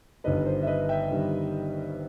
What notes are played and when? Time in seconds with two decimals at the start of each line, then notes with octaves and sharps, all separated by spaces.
0.24 G1 G2 D#3 G3 B4 D#5
0.46 C5
0.63 E5
0.67 B4 D#5
0.89 E5 G5
1.11 G1 G2 D#3 G3